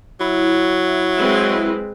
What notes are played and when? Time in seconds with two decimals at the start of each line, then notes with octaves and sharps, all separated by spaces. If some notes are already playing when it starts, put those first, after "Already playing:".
0.20 F#3 E4
1.18 G#3 C4 B4